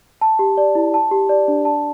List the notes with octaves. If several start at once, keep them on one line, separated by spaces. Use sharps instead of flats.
A5
G4
D5
E4
A5
G4
D5
D4
A5